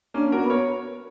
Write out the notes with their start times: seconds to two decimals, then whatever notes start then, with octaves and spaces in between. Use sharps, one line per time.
0.14 A#3 C#4 D4
0.32 F#4 A#4
0.41 B3
0.50 A#4 C#5